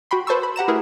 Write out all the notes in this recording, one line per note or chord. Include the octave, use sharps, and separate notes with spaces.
F#4 G5 B5 C6
B4 C5 A5 C#6 E6
B5
G4 F#5 A#5 E7
A3 E4 F#4 G#4 A#4 B4